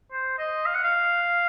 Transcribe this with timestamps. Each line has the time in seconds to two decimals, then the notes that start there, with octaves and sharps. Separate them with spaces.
0.12 C5
0.39 D#5
0.66 F5
0.75 F#5
0.84 F5